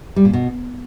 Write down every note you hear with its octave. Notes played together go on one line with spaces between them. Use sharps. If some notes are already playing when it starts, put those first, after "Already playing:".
G3
A#2
B2